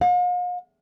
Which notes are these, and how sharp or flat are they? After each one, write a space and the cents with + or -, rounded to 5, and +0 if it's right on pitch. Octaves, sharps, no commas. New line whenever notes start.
F5 +45